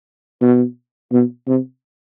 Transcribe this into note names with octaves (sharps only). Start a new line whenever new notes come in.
B2
B2
C3